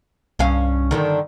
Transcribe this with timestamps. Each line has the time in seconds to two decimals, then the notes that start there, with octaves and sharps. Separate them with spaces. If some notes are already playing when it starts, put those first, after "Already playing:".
0.39 C2 G2 C#4 F5
0.91 G2 D3 D#3